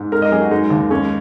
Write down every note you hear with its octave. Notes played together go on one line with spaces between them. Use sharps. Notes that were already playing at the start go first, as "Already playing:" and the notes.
Already playing: G#2
G#3 A#4
D#5
F#2 G#4
F#4
G#3 D#4
D#2
G#3 C#4